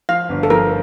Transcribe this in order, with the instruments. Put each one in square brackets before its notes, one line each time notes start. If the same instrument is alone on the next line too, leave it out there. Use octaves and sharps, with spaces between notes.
[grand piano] F3 [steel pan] F5
[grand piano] G1
[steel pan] A4
[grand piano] F3 [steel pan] A#4